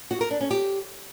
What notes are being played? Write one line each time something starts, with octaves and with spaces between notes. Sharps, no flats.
F#4
A#4
D4
C#4
G4